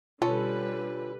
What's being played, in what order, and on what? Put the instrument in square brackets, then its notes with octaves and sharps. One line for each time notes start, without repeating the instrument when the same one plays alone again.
[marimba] B2 C#5 [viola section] D3 G3 B4 [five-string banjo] C#4 A4 [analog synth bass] F4